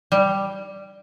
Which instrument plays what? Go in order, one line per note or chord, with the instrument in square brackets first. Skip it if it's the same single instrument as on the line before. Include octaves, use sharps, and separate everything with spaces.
[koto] G3